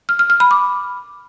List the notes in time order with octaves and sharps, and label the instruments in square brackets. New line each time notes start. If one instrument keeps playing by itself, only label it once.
[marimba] F6
F6
F6
B5
D6